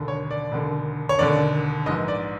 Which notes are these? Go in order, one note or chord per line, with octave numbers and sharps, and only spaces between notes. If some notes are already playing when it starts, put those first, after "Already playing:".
Already playing: E1 D#2 D3
C#5
D5
E1 D#2 D3
C#5
E1 D#2 D3 D5
A#1 G#2 E3 D#5
D5